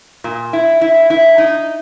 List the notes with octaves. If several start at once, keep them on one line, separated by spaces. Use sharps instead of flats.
A#2
E4
E4
E4
D#4